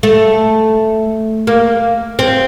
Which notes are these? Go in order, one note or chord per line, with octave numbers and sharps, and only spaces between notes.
A3
A#3
C4